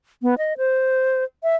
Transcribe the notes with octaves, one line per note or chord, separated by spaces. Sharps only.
B3
D#5
C5
E5